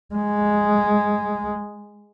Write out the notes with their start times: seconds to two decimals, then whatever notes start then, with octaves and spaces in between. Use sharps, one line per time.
0.15 G#3